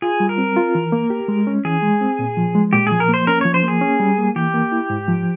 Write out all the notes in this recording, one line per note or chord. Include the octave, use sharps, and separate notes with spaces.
F4 G#4
G3
A#4
C4
F4
E3
A#3
G4
G#3
C#4
E3 G#4
G#3
C4
A#2
F3
G#3
A#2 G4
F3 G#4
A#4
A#3 C5
C#4 A#4
F3 C#5
C5
A#3 G#4
C#4
G3
A#3
E3 G4
A#3
E4
G#2
F3